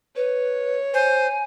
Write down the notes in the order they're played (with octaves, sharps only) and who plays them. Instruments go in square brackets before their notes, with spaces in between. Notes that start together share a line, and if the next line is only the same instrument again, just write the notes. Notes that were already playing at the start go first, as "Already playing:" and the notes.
[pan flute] B4 [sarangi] C#5
[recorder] C5 [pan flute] G#5